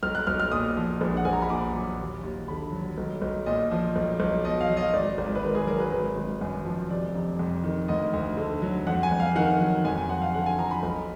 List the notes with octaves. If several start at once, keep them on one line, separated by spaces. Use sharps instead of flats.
B1 F6
F#6
B1 F6
F6
A#2 D#6
F3
A#1
F#5
A#1 G#5
A#5
B5
A#2 D6
F#3
D#2
D#2
D3 B5
F#3
B1
B1
A#2 D#5
F3
B1
B1
B2 D#5
F5
F#3
D#5
G#1 D5
G#1
B4
G#2 A#4
G#4
F#3 A#4
B4
G#1
G#1
F#2
F3
F1 D5
F1
F2
D#3
D2 D#5
D2
D3
F#3
F2 F#5
G#5
F2
F5
D#3 F#5
F#3
F2 G#5
G#5
F2 F#5
F5
D3 F#5
G#5
F3 A#5
B5
B1